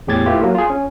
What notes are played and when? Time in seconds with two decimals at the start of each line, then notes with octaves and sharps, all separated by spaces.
0.07 E2 A2 G4 G#4 G#6 A6
0.26 A3 E4 F4 G4 B4
0.40 F#3 A#3
0.55 F4 G#4
0.70 C#4